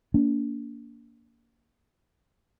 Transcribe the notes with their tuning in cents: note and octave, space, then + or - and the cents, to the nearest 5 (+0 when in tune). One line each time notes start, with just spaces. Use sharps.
A#3 +0 D4 -40